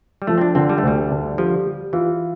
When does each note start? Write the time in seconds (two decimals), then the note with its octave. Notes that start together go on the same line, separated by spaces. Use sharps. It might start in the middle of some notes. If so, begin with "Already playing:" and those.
0.22 G3
0.27 F3 A3
0.38 C4
0.41 D4
0.55 D3 C4
0.69 G3
0.78 A3
0.83 D2 G3
1.10 D3
1.38 F3 G3
1.66 G3
1.93 E3 F4